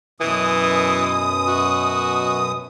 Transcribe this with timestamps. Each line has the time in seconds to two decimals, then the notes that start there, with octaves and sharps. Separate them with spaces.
0.20 F#2 B2 E3 D#6
1.47 F#4